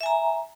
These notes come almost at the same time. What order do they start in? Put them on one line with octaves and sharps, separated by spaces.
E5 G#5 A#5